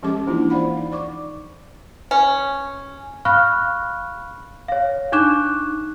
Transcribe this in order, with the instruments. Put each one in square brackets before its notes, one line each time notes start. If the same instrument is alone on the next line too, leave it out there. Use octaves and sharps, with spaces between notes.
[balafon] F3 G#3 C#4 G4 A4 D6
E3 A#3 D4 E4 F4
C5 D5 F5 F#5 B5
D#4
D5 C#6 D6
[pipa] C#4
[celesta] F5 B5 C#6 F6 F#6
C#5 F5
D4 D#4 C#6 D6 F#6 E7